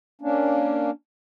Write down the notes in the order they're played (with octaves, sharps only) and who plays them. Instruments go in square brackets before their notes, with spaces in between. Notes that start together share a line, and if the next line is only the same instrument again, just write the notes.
[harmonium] A#3 C#4 D4